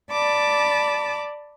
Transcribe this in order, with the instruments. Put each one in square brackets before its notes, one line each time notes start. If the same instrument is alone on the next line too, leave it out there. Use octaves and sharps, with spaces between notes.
[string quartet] D5 A5 B5 D6